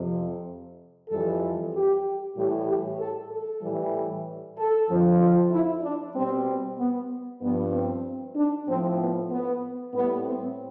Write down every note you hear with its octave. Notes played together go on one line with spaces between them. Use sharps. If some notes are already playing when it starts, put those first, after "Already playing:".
Already playing: F2 C3 F3
F2 E3 G3 A4
G4
A2 E3 G3 G4
G4
A4
A4
A2 E3 G3
A4
F2 D3 F3
F4
E4
D4
B2 G3 C4
B3
G2 F3 B3
C4
D4
A2 F3 C4
B3
B3
A2 B3
G3
C4